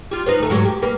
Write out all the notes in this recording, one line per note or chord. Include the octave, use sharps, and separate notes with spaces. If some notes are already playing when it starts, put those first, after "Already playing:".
G3 F4
D#4 B4 C5
D2 A3
G#2 F#3 G4
G4
G2 A#3 B4